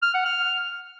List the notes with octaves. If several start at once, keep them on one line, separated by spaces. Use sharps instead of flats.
F6
F#5
F6